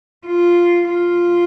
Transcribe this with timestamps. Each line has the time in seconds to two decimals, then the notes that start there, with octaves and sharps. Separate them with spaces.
0.26 F4
0.89 F4